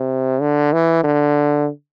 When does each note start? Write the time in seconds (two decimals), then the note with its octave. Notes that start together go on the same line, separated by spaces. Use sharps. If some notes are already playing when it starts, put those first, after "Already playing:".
Already playing: C3
0.41 D3
0.73 E3
1.04 D3